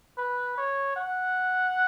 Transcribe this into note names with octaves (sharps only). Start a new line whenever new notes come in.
B4
C#5
F#5